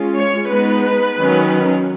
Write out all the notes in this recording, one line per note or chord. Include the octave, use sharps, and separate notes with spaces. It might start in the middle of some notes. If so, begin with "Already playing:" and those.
Already playing: G#3 C#4 F4
C#5
G#3 B3 D#4 B4
D#3 F#3 C#4